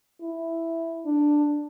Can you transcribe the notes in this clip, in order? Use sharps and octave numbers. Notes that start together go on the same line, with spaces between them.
E4
D4